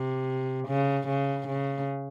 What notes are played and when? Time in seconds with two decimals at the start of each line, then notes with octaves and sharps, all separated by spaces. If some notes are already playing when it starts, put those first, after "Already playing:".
Already playing: C3
0.68 C#3
1.08 C#3
1.47 C#3